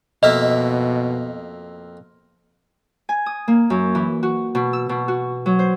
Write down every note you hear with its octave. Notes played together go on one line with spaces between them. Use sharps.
F2 B2 A#3 D#5 E5
G#5
D#6
A#3
F#2
E3
F#4
B2
E6
B2
F#4
F#3
C5